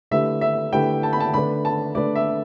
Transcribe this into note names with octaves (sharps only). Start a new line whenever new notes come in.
D3 A3 E4 G4 B4 E5
E5
D3 A3 E4 G4 B4 G5
A5
B5
A5
D3 A3 D4 B4 B5
A5
D3 A3 D4 B4 D5
E5